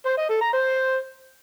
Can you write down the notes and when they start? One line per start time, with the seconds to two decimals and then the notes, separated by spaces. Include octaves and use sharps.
0.06 C5
0.17 D#5
0.29 A4
0.41 A#5
0.53 C5